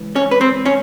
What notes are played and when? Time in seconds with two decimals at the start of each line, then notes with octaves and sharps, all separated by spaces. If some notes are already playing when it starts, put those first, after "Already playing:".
Already playing: C#2 E3
0.16 C#4 C#5
0.31 B4
0.41 C4 C5
0.65 C#4 C#5